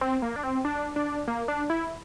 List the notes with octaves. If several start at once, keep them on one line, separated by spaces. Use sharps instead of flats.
C4
A#3
D4
C4
D4
D4
A#3
D4
E4